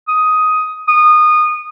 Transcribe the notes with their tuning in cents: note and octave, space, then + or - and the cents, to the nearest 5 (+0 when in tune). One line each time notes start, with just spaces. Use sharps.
D#6 +10
D#6 -20